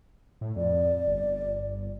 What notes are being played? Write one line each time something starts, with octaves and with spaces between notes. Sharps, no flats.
A2
F2 D5
G1